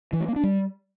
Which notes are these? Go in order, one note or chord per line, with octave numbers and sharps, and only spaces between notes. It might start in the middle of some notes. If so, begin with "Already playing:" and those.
E3
A3
A#3
D4
G3